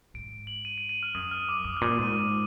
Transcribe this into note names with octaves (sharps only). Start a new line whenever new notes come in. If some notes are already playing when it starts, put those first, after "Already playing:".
G#2 D7
F#7
D#7
D7
D#7
F6
F#2 D#6
F6
D6
F#2 D#6
F6
A#2
G#2 D#7